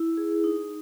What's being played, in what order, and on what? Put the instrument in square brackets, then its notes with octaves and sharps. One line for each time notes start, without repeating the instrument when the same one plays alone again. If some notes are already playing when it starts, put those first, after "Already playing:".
Already playing: [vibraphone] E4
G#4
D#4